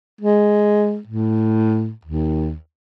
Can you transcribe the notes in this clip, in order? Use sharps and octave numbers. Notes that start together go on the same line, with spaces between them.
G#3
A2
D#2